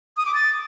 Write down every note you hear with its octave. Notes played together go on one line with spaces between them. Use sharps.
D#6
D6
A6